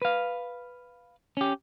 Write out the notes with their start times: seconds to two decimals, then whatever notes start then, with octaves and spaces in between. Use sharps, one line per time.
0.02 B4 F5
1.37 C#4 G4